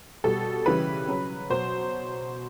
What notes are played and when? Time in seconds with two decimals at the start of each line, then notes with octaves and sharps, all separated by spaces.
0.24 B2 G3 A4
0.66 C#3 E3 G3 B4
1.08 C#3 F#3
1.50 B2 F#3 C5